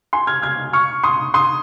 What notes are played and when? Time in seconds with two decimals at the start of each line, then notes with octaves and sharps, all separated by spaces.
0.13 G#5 C6
0.27 F6 G#6
0.42 F6 G#6
0.73 C#6 F6
1.03 C6 D#6
1.34 C6 D#6